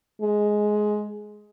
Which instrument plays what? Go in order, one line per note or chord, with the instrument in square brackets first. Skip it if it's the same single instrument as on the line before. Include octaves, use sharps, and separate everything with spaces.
[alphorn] G#3